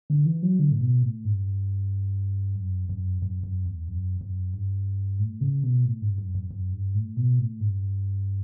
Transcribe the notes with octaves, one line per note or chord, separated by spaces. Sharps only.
D3
E3
F#3
D3
A2
B2
A2
G2
F#2
F#2
F#2
F#2
E2
F#2
F#2
G2
A2
C#3
B2
A2
G2
F#2
F#2
F#2
G2
A2
B2
A2
G2